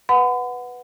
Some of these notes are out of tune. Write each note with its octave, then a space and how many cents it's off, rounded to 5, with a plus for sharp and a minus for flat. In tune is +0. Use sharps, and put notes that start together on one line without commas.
B4 +0 F#5 -5 B5 +40